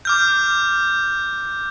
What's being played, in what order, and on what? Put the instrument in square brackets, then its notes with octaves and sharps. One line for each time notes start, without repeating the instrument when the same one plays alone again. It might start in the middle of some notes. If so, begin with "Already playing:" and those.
[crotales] D6 F6 G6